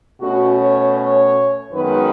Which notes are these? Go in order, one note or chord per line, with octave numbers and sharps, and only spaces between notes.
B2 A3 C#4 F#4
C#5
C#5
F#2 D#3 G#3 B3 B4